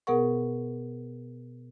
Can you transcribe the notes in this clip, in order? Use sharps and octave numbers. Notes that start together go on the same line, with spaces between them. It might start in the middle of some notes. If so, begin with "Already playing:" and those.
B2 B3 G#4 A#4 F#5 C#6